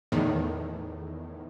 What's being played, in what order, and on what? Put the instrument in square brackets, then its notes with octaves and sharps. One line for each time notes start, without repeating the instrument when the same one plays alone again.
[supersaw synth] E2 A2 D#3